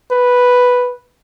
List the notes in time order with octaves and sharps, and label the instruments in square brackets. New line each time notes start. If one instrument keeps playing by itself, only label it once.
[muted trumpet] B4